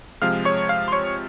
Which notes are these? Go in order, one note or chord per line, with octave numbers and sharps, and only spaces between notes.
C3 F3 G#3 F5 F6
C#5 C#6
F5 F6
C6
C#5 C#6